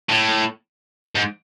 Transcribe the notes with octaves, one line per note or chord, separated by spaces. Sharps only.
A2
G#2